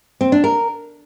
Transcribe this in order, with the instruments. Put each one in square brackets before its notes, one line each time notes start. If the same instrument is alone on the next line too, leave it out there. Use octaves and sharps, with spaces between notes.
[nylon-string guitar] C4
D4
A#4